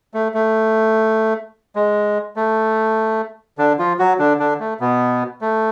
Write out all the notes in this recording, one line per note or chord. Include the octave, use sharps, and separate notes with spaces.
A3
A3
G#3
A3
D3 D4
F3 F4
F#3 F#4
D3 D4
D3 D4
A3
B2 B3
A3